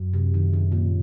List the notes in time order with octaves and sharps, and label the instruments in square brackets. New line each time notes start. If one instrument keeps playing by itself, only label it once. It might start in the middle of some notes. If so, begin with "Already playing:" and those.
Already playing: [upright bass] F#2
[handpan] C3
D#3
C#3
A#2